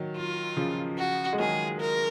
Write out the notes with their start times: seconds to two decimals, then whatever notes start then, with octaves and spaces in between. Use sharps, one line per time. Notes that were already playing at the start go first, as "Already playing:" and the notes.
Already playing: D#3 F#3
0.16 F4
0.57 C#3 F3
0.98 F#4
1.33 G#3
1.39 D#3 F#3 G#4
1.80 A#4